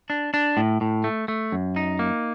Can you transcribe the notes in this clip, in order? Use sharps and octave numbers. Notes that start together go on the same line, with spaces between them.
D4
D4
A2
A2
A3
A3
F#2
D#4
A#3